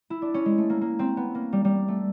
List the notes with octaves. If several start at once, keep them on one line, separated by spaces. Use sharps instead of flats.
E4
D4
C#4
G#3
A3
A#3
A#3
C4
B3
A#3
G3
G3
A3